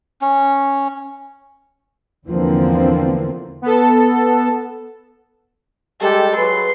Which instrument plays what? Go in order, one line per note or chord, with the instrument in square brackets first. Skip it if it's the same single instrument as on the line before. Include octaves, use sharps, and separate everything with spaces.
[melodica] C#4
[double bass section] E2 D3 E3 F3 A#3 C4
[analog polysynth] B3 A4
[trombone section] G3 G#3 G4 [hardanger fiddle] A4
[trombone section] F#3 G#4 B4 [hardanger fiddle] C6